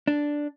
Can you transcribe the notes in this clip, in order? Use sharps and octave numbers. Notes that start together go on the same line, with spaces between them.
D4